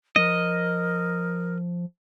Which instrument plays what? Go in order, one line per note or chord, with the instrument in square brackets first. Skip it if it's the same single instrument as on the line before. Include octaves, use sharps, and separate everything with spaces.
[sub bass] F3 [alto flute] A#4 [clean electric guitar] D#5